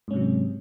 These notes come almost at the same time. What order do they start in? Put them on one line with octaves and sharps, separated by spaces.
G#2 C#4 C3 F#3